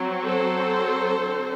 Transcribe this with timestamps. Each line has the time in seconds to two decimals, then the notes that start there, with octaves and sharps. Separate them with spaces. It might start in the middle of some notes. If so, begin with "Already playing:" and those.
Already playing: F#3 C4
0.25 A4 C5
1.20 D3 F#3 C4